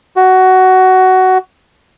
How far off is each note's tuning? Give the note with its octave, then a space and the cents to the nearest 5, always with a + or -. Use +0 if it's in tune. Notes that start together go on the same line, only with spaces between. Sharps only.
F#4 +15